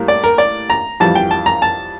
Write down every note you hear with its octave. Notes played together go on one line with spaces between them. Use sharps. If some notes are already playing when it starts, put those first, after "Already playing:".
Already playing: A2 G3 A#3
D5
A#4
D5
A#5
F2 E3 G3 A5
G5
A5
A#5
A5